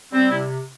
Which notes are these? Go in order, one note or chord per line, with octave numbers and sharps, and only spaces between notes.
G3 C4
C3 E4